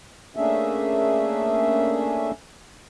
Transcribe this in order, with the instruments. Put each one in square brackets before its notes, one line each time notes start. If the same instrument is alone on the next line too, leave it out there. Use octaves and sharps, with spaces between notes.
[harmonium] A3 A#3 C#4 D4 G#4 E5